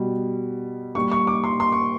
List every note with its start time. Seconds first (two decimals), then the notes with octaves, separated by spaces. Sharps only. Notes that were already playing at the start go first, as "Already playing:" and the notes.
Already playing: B2 G3
0.95 A#2 G3 C#6
1.12 C#6
1.27 D6
1.44 C6
1.60 C6
1.72 C#6